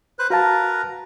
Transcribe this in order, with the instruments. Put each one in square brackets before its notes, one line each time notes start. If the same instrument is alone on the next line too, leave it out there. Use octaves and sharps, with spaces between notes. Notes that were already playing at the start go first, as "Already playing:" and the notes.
[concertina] B4 C5 F#6
[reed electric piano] F#4 F5 A5 [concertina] A#4 B4 A#5